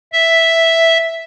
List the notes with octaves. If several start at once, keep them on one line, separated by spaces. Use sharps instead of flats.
E5